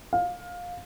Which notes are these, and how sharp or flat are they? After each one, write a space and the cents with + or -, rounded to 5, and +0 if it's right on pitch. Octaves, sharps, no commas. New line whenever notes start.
F5 +20